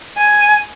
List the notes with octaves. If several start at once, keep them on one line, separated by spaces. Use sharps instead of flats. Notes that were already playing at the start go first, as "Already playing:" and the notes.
G#5